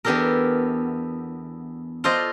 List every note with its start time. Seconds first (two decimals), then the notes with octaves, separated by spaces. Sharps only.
0.05 E2 B3 D4 G4 A4 A#4
2.04 F4 A4 C5 D5 D#5